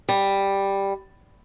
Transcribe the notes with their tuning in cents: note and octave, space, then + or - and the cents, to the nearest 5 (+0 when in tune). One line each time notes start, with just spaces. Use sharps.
G3 +5